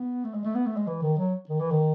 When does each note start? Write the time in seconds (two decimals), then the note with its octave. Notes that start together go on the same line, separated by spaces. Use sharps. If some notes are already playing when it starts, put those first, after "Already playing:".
Already playing: B3
0.24 A3
0.34 G#3
0.44 A3
0.55 B3
0.66 A3
0.76 G#3
0.87 E3
1.02 D#3
1.18 F#3
1.49 D#3
1.60 E3
1.71 D#3